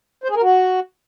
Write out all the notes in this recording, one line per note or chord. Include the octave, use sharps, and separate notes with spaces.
C5
G#4
A#4
F#4